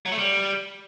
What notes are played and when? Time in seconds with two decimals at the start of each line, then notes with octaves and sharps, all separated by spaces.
0.06 F#3
0.12 A3
0.18 G3